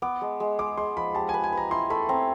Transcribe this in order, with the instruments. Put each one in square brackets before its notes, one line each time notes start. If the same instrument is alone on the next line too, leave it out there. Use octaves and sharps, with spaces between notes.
[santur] B3 [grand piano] D6
[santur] G#3
G#3
[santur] G#3 [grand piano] D6
[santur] G#3 [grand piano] C6
[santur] F3 [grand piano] B5
[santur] G4 [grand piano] A5
[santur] B4 [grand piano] G#5
[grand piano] G#5
[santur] B4
[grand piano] A#5
[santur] E4 [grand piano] C6
[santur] A3 [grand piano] B5
[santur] C4 [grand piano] A#5